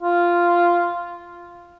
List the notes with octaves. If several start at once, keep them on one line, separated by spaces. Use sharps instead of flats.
F4